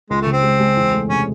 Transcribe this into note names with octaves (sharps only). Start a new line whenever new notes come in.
C#2 G#3
A3
C#3
C4
G#3
G#3
E2
A3
C3 C#4